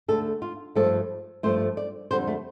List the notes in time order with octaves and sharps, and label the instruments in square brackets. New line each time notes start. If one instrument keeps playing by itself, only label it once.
[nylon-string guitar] D2 D3 A3 A4
F4
G2 F3 A3 A4
G2 F3 A3 C5
D5
F2 D3 G3 C5
A3